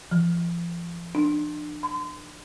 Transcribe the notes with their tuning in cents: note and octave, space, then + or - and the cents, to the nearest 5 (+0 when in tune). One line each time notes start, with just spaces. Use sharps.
F3 -35
D4 +30
C6 -35